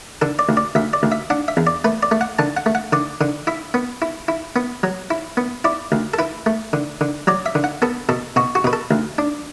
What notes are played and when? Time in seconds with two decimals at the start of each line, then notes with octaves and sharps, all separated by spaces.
0.22 D3 A4
0.39 D5
0.49 D2
0.57 D5
0.75 D2 E5
0.93 D5
1.03 D2
1.12 E5
1.30 D4 F#5
1.48 E5
1.57 E2
1.67 D5
1.84 A3 B4
2.03 D5
2.11 A3
2.21 F#5
2.39 D3 A5
2.57 F#5
2.66 A3
2.75 F#5
2.93 D3 D5
3.21 D3
3.47 E4 E5
3.74 B3
4.02 E4
4.28 E4
4.56 B3
4.83 F#3
5.10 E4
5.37 B3
5.64 E4 D5
5.92 D2
6.14 A4
6.19 E4 B4
6.46 A3
6.73 D3
7.01 D3
7.27 F#3 D5
7.46 E5
7.55 D3
7.64 F#5
7.82 B3 A4
8.09 B2 A4
8.36 B2 F#4
8.55 F#4
8.64 B2 B4
8.73 A4
8.91 D2
9.18 D4